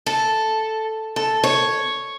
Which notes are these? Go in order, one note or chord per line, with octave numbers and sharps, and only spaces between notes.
A4
A4
C#5